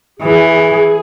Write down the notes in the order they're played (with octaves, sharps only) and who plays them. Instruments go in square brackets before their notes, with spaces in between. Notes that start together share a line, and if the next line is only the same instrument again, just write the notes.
[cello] E3 [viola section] G#4